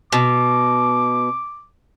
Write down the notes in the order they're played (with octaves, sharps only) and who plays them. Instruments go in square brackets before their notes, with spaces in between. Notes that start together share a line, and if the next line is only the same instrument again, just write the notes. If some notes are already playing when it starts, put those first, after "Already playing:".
[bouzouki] B2 [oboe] D6